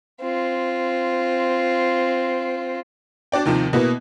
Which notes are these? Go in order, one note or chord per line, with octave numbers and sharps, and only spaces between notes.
C4 F4
D4 F#4 D5 G5
D#2 C3 D#3 F3
B2 A#3 B3 E4